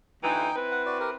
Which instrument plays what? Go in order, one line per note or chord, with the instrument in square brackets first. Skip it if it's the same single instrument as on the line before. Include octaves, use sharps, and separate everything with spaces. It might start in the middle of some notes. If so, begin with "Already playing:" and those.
[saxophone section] D2 E3 [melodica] D#4 G5
[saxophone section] C4 E4 B4
[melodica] F#5
F#4 D5
G4 A#4